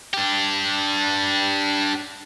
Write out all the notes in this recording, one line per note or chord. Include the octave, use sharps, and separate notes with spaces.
D4 G4